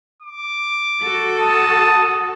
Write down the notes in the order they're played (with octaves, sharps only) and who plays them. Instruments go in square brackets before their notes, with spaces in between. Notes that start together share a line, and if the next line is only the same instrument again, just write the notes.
[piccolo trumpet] D6
[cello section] F#4 A4
[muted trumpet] A5 [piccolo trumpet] D#6